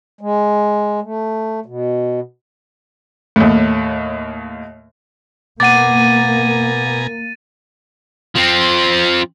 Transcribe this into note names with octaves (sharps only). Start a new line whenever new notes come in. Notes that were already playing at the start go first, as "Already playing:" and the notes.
G#3
A3
B2
D#2 A2
B2 A#3 F#5 G#5 A#5 D6 A6 D#7
F3 C4